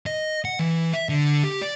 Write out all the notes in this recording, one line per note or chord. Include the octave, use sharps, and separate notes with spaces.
D#5
F#5
E3
E5
D3
G4
D5